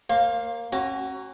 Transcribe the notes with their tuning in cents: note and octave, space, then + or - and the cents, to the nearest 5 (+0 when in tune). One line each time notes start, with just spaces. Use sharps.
A#3 +0 C5 +45 F5 +0
C#4 -30 F#4 +20 A#5 +0